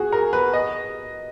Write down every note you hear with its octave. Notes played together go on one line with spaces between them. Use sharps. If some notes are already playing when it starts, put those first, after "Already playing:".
Already playing: F#4 G#4
A#4
B4
D#5